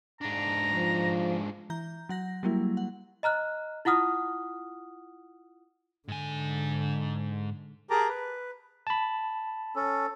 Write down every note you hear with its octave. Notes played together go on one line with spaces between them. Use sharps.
G#2 D4 A#5
F3
E3 A#5 G6
F#3 F#5 A#6
F#3 G3 A#3 E4
F#5
D#5 A#5 F6 F#6
E4 F4 F#5 D#6 F6
G#2 D3 G#5
G4 G#4 A#4 A5 A#5 D6
B4
A5 B5
C#4 A4